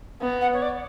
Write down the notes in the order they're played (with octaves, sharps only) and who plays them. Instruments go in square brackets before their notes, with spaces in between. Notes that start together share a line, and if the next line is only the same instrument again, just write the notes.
[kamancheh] B3
[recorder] F#5
C#5
D5